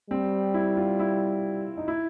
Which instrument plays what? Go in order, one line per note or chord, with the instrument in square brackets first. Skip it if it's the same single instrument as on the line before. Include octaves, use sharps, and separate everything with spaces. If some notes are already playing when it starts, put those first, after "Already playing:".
[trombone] G3 [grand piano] C4
[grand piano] E4
F4
E4
D#4
E4